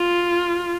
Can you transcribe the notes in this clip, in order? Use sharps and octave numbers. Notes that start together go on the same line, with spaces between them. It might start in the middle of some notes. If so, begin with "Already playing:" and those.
Already playing: F4